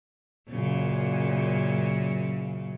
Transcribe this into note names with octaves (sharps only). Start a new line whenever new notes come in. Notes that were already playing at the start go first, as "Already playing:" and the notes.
F#2 A#2 C#3